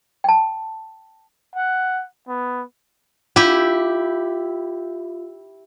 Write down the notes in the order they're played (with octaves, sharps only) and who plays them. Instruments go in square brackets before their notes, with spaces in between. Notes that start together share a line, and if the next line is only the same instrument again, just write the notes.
[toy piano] G5 A5
[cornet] F#5
B3
[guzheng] E4 G4 [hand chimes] F4